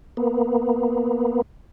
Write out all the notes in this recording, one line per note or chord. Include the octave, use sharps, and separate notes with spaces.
A#3 B3